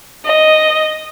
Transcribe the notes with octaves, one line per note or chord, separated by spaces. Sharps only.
D#5